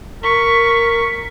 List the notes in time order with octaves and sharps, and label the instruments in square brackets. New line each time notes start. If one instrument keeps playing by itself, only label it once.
[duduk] A#4 [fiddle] C#6 [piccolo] B6